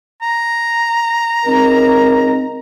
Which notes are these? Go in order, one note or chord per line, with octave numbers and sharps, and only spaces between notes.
A#5
C#2 C4 D#4 A#4